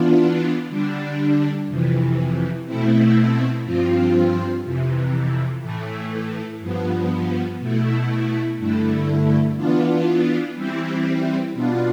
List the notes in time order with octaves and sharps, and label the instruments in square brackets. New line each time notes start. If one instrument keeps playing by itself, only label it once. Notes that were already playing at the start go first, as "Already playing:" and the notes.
Already playing: [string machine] E3 B3 D4 F4
D3 G3 D4
F2 C3 E3
B2 A3 C4 E4
G2 F3 C4 F4
F2 C3 E3
A2 E3 A3
G2 F3 B3
B2 A3 E4
G2 D3 A3 E4
E3 B3 D4 F4
E3 G3 C4 E4
B2 B3 D4 F4